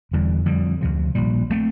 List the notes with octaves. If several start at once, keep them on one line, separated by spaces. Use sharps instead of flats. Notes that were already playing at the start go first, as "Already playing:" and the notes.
E1 E2 D3 G3
F2 D3 G3
D2 C3 F3
A#1 A#2 G3
D3 A3 C4